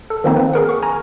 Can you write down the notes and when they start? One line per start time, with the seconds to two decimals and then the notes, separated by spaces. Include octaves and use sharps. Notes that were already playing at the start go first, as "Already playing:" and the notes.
0.10 A4
0.24 D#3 F3 A#3 C4 D#4
0.37 B4
0.53 G#4 A#4 F#5
0.69 C#6
0.83 G#5 A#5 F6